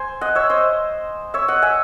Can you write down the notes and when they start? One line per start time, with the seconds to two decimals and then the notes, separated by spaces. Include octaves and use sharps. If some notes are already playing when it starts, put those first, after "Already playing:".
Already playing: C5 G#5
0.21 D#5 F#5
0.35 C#5 E5
0.50 C5 D#5
1.34 C#5 E5
1.48 D#5 F#5
1.62 E5 G#5